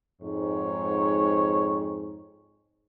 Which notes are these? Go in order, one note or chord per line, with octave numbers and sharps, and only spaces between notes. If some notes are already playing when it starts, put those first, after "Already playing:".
F2 G#2 C#5